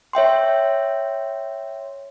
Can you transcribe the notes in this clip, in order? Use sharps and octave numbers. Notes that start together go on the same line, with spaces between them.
C#5 E5 G5 C6